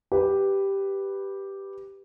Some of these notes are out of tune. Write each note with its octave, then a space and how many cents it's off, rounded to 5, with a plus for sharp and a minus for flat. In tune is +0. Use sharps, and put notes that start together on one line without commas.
G4 +0 B4 +0